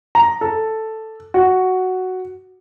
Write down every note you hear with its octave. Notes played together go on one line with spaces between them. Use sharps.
A#5
A4
F#4